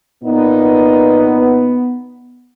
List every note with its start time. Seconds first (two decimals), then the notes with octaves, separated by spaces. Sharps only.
0.24 A#2 B3 D#4